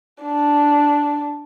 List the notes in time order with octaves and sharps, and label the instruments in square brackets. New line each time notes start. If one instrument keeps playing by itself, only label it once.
[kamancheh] D4